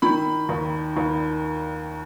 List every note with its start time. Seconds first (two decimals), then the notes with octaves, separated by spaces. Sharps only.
0.02 D#3 B5
0.49 D#2
0.97 D#2